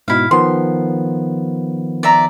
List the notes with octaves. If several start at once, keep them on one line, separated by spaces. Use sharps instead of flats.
G#2 B2 E4 F5
D#3 F3 B3 C6
D5 E5 A#5